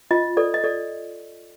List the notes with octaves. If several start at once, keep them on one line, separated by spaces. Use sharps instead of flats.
F4 D#5
A4 D5
D#5
A4 D5